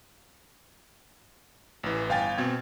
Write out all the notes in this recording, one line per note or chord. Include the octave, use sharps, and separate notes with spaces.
A1 E3
G1 F5 G5 G#5 A6
B2 C4 G#6